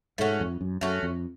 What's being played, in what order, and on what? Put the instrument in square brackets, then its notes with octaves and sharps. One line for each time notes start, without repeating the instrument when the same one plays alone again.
[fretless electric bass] G#2 [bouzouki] A3 C#4 F#4
[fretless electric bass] F2
F#2
[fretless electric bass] F#2 [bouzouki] A3 C#4 F#4
[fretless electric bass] F2